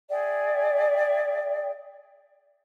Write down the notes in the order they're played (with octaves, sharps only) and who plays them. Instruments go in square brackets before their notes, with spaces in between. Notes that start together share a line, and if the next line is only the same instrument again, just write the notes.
[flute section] G#4 D5 E5 G5